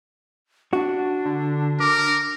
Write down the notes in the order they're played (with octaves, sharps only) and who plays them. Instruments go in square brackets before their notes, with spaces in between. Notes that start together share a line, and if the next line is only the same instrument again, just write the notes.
[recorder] D4 [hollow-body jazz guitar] F#4
[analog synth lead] D3
[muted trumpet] A#4 [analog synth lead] D6